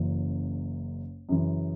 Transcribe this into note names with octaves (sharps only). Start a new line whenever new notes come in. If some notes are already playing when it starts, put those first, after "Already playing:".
Already playing: F#1 F#2 E3
F#2 C#3 E3